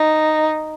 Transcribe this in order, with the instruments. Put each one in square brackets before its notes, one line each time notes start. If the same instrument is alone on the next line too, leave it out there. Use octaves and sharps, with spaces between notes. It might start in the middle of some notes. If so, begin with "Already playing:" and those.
Already playing: [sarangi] D#4